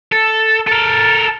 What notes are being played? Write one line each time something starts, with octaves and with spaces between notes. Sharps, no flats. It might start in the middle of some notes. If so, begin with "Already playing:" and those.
A4
A4 A#4